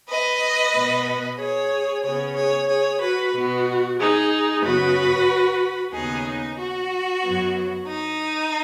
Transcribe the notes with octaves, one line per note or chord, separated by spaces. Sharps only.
B4 D#5
B2 B3
G#4 C#5
C#3 B3 G#4 C#5
G#4 C#5
G#4 C#5
F#4 B4
B2 B3 F#4
D#4 G#4
F#2 C#3 B3 F#4 B4
D#2 C#3 B3 D#4 G#4
D#4
F#4
F#2 F#3 B3
D#4